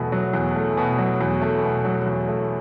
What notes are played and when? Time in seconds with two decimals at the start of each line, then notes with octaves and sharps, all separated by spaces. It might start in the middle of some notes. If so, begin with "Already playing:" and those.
Already playing: E2 B2 F#3 A3
0.12 F#3
0.33 E2
0.55 A3
0.77 B2
0.98 F#3
1.21 E2
1.41 A3
1.63 B2
1.85 F#3
2.06 E2
2.28 A3